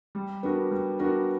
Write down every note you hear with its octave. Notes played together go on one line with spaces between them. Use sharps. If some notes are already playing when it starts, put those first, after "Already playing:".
G3
B3 D4 F#4 A#4
G3
B3 D4 F#4 A#4